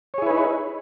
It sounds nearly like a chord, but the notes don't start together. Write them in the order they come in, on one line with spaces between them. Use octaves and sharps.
C#5 G#4 E4 B4 D#4